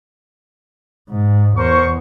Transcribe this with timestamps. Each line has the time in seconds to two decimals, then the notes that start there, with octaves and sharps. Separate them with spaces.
1.10 G#2
1.57 E2 A#4 C5 C#6